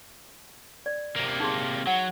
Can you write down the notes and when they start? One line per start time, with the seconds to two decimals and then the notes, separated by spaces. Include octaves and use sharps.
0.86 D5
1.16 C3 A#3
1.40 D#4 G#4 C6
1.87 F#3 F#5